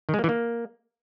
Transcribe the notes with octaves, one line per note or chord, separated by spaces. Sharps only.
D#3
G#3
A#3
E3
A#3